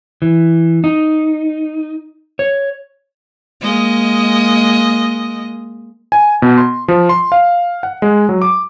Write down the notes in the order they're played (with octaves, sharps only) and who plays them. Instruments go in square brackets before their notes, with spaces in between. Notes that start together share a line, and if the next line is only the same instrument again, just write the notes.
[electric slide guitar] E3
D#4
C#5
[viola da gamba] G#3 A#3 D#5
[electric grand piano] G#5
B2
C6
F3
C6
F5
F#5
G#3
F#3
D6